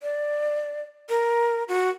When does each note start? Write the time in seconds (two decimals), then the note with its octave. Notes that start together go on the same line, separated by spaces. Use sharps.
0.03 D5
1.10 A#4
1.68 F#4